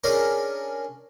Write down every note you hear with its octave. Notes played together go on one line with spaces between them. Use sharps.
C#4 D4 G#4 A#4